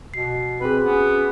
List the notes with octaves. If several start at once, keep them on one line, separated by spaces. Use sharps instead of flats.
B2 C7
C4 F#4 G#4 B4
B3 C#4